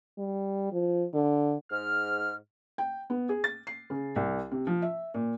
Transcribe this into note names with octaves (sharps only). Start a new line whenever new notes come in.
G3
F3
D3
G#2 F6
G5
B3
G#4
A6
C7
C#3
C2
C3
F3
E5
A#2